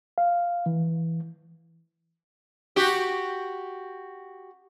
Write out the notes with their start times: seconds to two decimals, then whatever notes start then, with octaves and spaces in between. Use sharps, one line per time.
0.18 F5
0.66 E3
2.76 F#4 G4